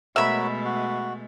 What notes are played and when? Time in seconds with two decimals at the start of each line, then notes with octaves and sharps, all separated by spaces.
0.16 B2 G#3 A3 F#4 A#4 C#5 E5 B5
0.65 F#4